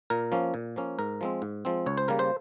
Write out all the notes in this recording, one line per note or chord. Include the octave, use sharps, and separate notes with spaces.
A#2 A#4
F3 A#3 C#4
A#2
F3 A#3 C#4
G#2 A#4
F3 G#3 C4
G#2
F3 G#3 C4
C#2 C#5
C5
C#3 G3 A#3 A#4
C5